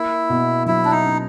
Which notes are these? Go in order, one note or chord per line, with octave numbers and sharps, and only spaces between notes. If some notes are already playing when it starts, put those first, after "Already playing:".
Already playing: A#3 E4
B2
F#3 E4
D4
D#4
C#4